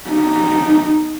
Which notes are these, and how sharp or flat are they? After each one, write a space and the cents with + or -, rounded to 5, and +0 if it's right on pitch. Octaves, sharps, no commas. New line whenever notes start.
D#4 -10